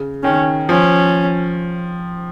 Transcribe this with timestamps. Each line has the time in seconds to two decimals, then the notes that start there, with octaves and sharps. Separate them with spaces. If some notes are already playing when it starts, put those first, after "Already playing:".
Already playing: C#3
0.23 D#3 C#4
0.69 F3 C#4